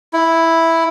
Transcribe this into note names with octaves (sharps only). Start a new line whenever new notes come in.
E4